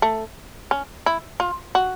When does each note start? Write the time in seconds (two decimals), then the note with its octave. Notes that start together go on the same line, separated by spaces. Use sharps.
0.02 A3
0.71 C#4
1.06 E4
1.40 F4
1.75 F#4